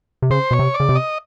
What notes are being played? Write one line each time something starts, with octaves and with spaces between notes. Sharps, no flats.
C3
C#3 C5
B2 C#5
C3
D5
C#3
C3
D#5